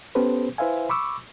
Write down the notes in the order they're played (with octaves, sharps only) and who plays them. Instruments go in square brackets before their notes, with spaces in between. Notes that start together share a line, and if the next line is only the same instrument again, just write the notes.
[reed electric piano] B3 C#4 G4 A4 B4 C5
E4 B4 C5 E5 F5 G#5
B5 C#6 D6 E6